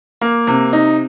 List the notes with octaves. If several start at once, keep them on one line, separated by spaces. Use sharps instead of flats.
A#3
C3
D#4